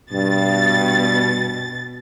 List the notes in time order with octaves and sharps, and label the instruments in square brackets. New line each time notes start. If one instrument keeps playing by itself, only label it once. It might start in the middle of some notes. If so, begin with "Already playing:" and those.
[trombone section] G2 [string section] B2 A6